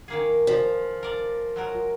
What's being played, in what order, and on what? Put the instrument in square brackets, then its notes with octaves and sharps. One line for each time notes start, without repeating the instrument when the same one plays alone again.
[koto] D#3 A#3 G#4
[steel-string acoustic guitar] F3
[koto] A#4 D5
F#3 G#3 A#4